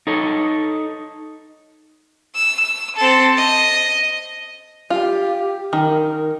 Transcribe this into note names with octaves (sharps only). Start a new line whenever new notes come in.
D#4 A4 C#5
E6
C4 A4
D#5
F4 G4
D#3 A#4